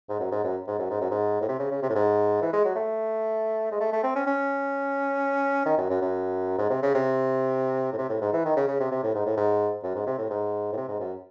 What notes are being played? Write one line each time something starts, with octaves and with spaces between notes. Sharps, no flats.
G#2
F#2
G#2
F#2
G#2
F#2
G#2
F#2
G#2
A2
C3
C#3
C#3
C3
A2
G#2
E3
G#3
F#3
A3
G#3
A3
A3
C4
C#4
C#4
D#3
F#2
F#2
F#2
G#2
C3
C#3
C3
A2
C3
A2
G#2
E3
D#3
C#3
C#3
C3
C3
A2
G#2
A2
G#2
F#2
G#2
C3
A2
G#2
A2
C3
G#2
F#2